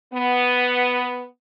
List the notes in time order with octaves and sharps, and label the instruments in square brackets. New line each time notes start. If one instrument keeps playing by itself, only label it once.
[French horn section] B3